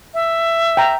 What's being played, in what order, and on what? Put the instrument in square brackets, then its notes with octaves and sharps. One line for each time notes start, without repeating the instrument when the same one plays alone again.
[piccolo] E5
[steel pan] G5 A#5